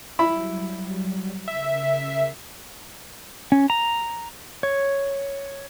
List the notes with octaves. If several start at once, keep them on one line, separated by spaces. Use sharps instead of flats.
F#3 G3 E4 B5
C#3 A#4 E5 C7
C#4
A#5
C#5